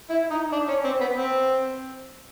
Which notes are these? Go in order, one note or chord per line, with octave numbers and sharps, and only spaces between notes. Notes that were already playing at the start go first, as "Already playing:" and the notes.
E4
D#4
D4
C#4
C4
B3
C4